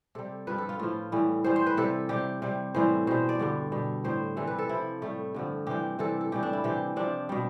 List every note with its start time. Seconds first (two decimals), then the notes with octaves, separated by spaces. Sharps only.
0.15 C3 G3 A4
0.47 G2 F3 B4
0.58 A4
0.69 F4
0.79 A2 F3 F4
1.12 A2 E3 G3
1.44 A2 E3 G3 C5
1.56 C5
1.66 B4
1.77 C3 G3 A4
2.09 C3 G3 G4
2.42 C3 G3
2.75 A2 E3 G3 C5
3.07 B2 G3 C5
3.29 D5
3.39 G2 D3 G3
3.72 B2 G3
4.04 A2 G3 C5
4.36 C3 E3 G3 A4
4.47 B4
4.58 A4
4.69 C3 F3 E4
5.02 A2 G3 A3
5.34 G2 D3 F3
5.67 C3 E3 G3 G4
5.99 C3 E3 G3 A4
6.21 A4
6.32 A2 E3 G3 G4
6.43 D4
6.53 E4
6.64 C3 E3 G3 G4
6.96 C3 F3 D4
7.29 B2 G3